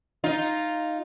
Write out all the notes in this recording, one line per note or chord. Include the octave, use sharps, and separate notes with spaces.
D#4 F4